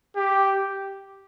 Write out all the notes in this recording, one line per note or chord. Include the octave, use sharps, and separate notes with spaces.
G4